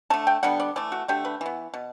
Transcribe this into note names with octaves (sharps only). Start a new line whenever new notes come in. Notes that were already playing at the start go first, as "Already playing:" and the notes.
D3 A3 A5
G5
D3 G3 B3 F#5
D5
E3 A3 D5
F#4
D3 A3 G4
B4
E3 B3
B2